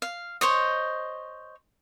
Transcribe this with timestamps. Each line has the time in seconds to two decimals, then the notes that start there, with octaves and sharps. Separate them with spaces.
0.02 F5
0.41 C5 C#5 D#5